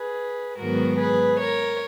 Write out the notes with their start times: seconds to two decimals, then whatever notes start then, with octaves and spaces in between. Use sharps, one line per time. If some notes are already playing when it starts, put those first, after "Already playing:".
Already playing: G#4 B4
0.58 G#2 D#3 F#3 B3 F#4 A#4
0.98 G#4 B4
1.39 A#4 C#5